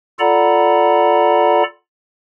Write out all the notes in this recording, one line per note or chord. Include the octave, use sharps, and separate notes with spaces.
F4 A4 D5 F#5 A#5 B5